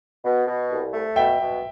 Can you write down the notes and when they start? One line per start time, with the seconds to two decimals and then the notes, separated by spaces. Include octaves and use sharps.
0.25 B2
0.47 B2
0.71 C2
0.93 A3
1.16 B2 E5 G5
1.40 B2